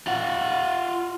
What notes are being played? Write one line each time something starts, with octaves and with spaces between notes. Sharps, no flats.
F4 F#5